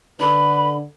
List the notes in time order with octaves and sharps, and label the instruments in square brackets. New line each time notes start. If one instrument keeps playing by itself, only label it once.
[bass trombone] D3 [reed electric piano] D4 A4 [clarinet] B4 [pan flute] B5